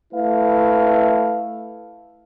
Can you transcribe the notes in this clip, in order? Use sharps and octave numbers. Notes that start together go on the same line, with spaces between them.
A3 E4 B4 F5